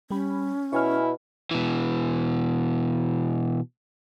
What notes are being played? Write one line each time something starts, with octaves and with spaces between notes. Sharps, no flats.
G3 C#4 G4 B5
B2 E4 C#5 G#5 F6
B2 E3